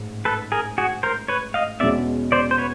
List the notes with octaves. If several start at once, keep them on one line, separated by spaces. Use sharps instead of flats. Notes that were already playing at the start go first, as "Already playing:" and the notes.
Already playing: A1 G#2
A4 B4
G#4 A#4
F#4 G#4
A#4 C5
B4 C#5
D#5 F5
E2 B2 G#3 C#4 D5 E5
C5 D5
C5
B4 C#5